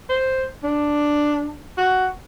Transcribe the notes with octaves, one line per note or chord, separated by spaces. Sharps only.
C5
D4
F#4